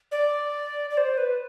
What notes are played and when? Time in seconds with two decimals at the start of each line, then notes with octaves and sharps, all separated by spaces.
0.12 D5
0.90 D5
0.97 C5
1.18 B4